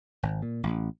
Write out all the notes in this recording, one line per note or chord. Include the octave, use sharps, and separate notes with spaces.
G#1
A#2
A1